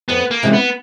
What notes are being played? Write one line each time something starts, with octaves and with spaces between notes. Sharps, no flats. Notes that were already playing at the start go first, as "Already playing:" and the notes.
F2 B3
A#3
C3 E3 G#3 C#4
B3